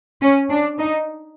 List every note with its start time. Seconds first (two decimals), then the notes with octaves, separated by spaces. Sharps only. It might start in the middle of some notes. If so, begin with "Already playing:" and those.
0.21 C#4
0.50 D4
0.79 D#4